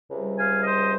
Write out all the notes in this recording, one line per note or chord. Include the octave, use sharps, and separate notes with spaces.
C#2 C3 G3
F5 G#5
C5 D#5